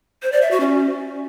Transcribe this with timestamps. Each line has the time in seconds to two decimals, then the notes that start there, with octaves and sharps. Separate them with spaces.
0.23 C5
0.32 D5
0.41 E5
0.51 F#4
0.60 C#4